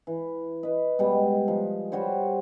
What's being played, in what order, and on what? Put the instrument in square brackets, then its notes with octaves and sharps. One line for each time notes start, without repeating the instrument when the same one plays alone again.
[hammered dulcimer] E3
B4 D#5
B2 G3 G#3
F3
G3 F#4 C5 C#5